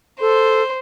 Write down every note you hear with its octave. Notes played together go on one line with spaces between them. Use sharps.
A4 C5